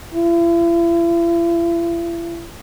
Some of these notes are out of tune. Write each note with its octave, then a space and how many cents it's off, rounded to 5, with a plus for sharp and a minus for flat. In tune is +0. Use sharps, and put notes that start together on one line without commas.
E4 +45